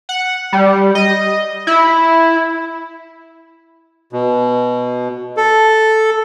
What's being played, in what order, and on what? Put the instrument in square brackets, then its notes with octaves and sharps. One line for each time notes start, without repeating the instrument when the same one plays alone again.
[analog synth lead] F#5
G3
D#5
E4
[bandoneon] B2
A4